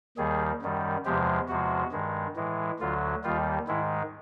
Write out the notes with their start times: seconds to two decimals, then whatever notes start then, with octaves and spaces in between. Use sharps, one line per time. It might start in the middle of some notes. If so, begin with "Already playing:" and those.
0.18 D#2 D#3 G3 G#4
0.62 F#2 D#3 G3
1.05 E2 C3 F3 G#3 G4
1.49 E2 C3 F3 G#3 F#4
1.92 G2 D#3 G#3
2.36 A2 E3 G#3
2.80 D2 D3 F#3 F4
3.24 D#2 D#3 G3 F4
3.68 G#2 D#3 G#3 E4